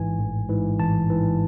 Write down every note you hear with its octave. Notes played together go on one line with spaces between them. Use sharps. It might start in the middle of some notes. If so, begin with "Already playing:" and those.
Already playing: A1 G#2 E3 G#5
A1
G#2 E3
A1 A5
G#2 E3